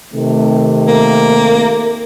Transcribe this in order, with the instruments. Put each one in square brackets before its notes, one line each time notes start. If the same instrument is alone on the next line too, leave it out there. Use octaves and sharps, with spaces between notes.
[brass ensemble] C3 D#3 A3
[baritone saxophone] A#3